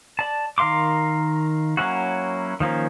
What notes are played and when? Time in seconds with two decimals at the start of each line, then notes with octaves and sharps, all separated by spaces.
0.19 D5 A5
0.58 D#3 A#4 F5 C6 D6
1.77 F#3 A#3 C#4 E4 F#4
2.60 D#3 F3 A#3 C#4